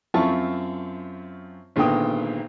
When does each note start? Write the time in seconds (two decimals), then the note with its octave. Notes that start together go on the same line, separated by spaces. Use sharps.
0.14 F#2 C4 F4 E5 A5 C#6
1.76 G#1 A#2 D3 B3 G5 D#6